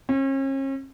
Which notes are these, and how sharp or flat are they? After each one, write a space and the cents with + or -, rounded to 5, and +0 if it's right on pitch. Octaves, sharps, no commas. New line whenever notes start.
C#4 -40